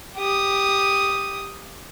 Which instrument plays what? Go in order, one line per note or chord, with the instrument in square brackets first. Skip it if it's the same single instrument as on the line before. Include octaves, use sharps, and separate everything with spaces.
[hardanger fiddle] G4 D#6